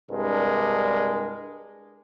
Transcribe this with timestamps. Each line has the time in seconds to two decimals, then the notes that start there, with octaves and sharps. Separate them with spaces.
0.11 C2 G2 G#3 D4 A#4